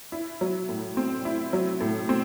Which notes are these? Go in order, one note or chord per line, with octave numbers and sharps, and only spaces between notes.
E4
F#3
A2
C4
E4
F#3
A2
C4